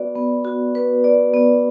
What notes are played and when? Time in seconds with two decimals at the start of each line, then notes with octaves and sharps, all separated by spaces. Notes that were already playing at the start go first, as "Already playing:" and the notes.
Already playing: B3 F#4 B4 D5
0.15 B3
0.45 F#4
0.75 B4
1.04 D5
1.34 B3